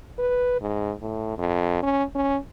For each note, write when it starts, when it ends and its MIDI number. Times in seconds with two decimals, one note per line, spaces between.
0.19 0.59 71
0.61 0.92 44
1.02 1.37 45
1.38 1.80 41
1.83 2.04 61
2.15 2.37 61